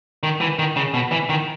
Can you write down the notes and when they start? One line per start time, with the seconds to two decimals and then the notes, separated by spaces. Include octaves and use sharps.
0.23 D#3
0.41 E3
0.59 D#3
0.76 C#3
0.94 B2
1.12 E3
1.29 D#3